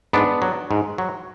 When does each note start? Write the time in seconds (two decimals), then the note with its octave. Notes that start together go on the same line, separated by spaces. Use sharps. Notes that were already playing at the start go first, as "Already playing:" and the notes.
0.13 G#2 B3 D4
0.42 F#3
0.71 G#2
0.98 F#3